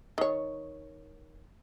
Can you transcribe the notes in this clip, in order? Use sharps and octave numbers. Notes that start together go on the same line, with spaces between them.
D#3 C#5